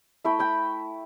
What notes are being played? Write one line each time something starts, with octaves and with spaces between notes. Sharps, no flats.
A3 E4 G5 B5
G5 B5